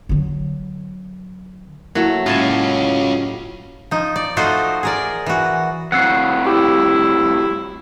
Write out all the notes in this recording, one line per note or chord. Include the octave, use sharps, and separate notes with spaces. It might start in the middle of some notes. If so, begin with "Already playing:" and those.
D3 F#3
F#3 A3 A#3 E4 F#4
A2 C#4 F4 G#5 A5
F3 D#4
D5
F3 A3 D#4 F4 F#4 C5
G#4 A#4 D5
E3 F#4
F2 A2 F#5 E6 C7
E4 G4